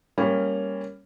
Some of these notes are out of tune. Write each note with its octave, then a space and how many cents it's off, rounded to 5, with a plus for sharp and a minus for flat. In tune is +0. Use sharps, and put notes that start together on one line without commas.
G3 +20 A#3 +0 C#4 +0